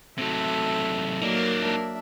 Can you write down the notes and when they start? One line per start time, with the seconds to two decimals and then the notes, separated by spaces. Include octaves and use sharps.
0.18 C3 F#3 A3 E5
1.22 F#3 A#3 D#4 A#4 D5
1.60 D4 E5